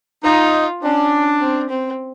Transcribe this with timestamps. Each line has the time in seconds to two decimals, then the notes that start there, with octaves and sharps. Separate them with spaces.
0.23 D#4 F4
0.82 C#4 D4
1.41 C4
1.70 C4